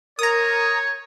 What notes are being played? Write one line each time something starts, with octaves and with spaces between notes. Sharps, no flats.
A#4 C#5 A#5 D#6